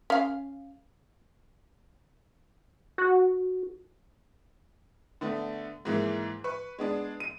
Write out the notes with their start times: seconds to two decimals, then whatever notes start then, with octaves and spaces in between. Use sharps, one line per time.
0.10 C#4 F5
2.98 F#4
5.21 D3 A3 B3
5.85 G#2 E3 A#3
6.44 B4 C#6
6.78 G#3 B3 D4
7.20 D#7